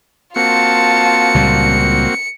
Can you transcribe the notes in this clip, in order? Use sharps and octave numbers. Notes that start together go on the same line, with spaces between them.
A#3 C4 F4 F#4 A5 C#7
C#2 A#2 G3